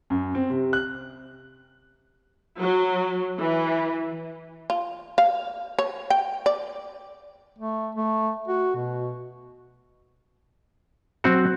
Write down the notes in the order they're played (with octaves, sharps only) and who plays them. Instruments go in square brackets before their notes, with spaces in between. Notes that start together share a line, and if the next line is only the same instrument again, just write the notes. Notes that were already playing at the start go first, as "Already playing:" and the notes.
[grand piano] F#2
C4
C3
F#6
[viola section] F#3
E3
[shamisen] F4
F5
C#5
G5
D5
[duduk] A3
A3
F#4
B2
[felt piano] F#3 F#6 [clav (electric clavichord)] C4 F#4